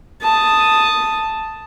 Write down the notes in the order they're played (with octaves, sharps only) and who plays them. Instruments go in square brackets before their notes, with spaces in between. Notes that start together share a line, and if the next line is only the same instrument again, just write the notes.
[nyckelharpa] A5 D#6